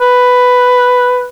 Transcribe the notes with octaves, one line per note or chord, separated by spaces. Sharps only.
B4